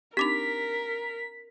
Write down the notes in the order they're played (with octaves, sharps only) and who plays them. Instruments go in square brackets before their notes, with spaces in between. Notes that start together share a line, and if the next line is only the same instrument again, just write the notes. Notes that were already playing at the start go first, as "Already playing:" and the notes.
[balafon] C4 D4 D#4 [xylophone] G4 D6 F7 [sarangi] A#4 [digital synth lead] B6